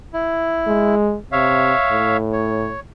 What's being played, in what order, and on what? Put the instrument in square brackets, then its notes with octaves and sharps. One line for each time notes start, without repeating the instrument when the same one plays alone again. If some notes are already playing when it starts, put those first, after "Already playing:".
[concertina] E4
[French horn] G#3
[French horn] C3 [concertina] C#5 E5 F5
[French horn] A2
[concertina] C#5